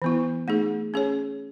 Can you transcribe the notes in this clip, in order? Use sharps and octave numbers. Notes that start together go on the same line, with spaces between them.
E3 B3 E4
A3 D#4 G#4
C#4 G#4 C#5